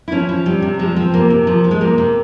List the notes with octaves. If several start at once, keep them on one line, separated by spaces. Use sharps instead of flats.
E4
F3 C#4
F3
C3 G3
C3
F3 G#3
F3 C4
C3 A#3
C3
F3
F3
G#3
C3 A#3
C3